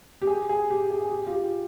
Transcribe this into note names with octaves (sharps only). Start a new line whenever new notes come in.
G4
G#4
G#4
G4
G#4
G#4
G4
F4
G4